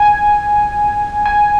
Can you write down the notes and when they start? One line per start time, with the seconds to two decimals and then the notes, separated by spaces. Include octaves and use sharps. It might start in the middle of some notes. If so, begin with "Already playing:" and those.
Already playing: G#5
1.26 G#5